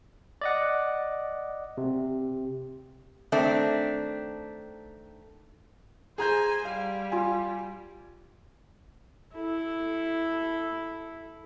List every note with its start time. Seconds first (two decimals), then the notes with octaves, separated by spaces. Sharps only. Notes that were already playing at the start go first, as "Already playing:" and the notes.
0.41 D5 D#5 F#5
1.77 C3
3.32 D#3 A3 C4 D4
6.18 G#4 C5 G#5 A#5 G6
6.65 G3 F5
7.12 F4 G#5
9.34 E4 A4